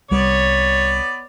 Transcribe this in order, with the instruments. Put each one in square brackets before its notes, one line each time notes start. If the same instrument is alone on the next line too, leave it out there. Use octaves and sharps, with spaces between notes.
[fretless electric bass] C2 G3 [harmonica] B3 D5 [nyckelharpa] C#5